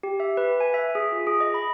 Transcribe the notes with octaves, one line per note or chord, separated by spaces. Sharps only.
G4
E5
B4
G#5
E5
G#4
F4
G#4
D#5
B5